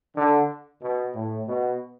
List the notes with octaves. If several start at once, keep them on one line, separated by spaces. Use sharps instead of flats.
D3
B2
A2
B2